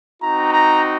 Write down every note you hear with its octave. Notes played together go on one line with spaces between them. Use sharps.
C4 D#4 F#4 A#5
A#5